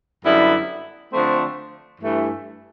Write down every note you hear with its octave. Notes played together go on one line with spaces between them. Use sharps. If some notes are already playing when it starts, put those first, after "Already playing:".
F#2 D3 G3 B3 E4
D3 F3 A3 C4
G2 E3 A3